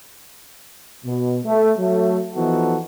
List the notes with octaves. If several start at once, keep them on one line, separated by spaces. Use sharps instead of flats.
B2
A3
F#3 A3
E3 F3 B3 D#4 F#4 A4